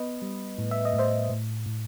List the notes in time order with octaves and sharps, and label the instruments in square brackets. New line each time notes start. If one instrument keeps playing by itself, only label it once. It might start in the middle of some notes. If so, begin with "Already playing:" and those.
Already playing: [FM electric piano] B3 B4 D#5
G3
A2
E5
D#5
A2
C5 E5
A2
A2